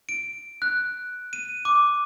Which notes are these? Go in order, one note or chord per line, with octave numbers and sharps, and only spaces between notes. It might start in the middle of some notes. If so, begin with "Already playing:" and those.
D7
F#6
D#7
D6